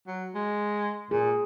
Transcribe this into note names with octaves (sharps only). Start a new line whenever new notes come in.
F#3
G#3
A#2 G#4